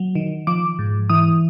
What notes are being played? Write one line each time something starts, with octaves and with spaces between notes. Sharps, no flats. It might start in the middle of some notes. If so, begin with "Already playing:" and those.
Already playing: F#3
D#3
F3 D6
G#2
E3 D#6